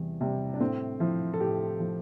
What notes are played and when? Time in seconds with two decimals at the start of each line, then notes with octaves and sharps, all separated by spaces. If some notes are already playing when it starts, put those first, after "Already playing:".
Already playing: E2 C3 G3
0.21 C3 G3
0.54 D4
0.60 A2 C4
1.00 F3 E4
1.33 A4
1.40 A2 G4
1.80 F3